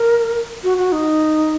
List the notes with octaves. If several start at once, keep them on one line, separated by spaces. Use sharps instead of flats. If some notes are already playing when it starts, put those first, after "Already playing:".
Already playing: A#4
F#4
F#4
D#4